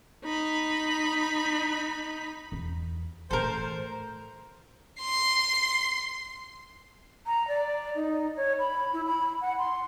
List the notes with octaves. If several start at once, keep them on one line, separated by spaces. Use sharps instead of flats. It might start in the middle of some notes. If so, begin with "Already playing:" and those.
D#4 B5
E2
A2 E3 A4 A#4 C5
C6 C7
A#5
D5
D#4
C#5
B5
E4
B5
F#5
C6